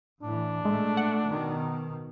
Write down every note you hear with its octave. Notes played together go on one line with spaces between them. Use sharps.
A2 E3 D4
A#2 G#3 A3
F#5
B2 D#3